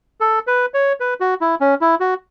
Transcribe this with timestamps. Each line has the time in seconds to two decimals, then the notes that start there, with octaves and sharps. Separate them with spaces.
0.21 A4
0.47 B4
0.74 C#5
1.00 B4
1.20 F#4
1.41 E4
1.60 C#4
1.81 E4
2.00 F#4